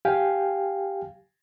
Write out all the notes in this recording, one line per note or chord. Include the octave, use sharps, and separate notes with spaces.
G4 F5 G5 G#5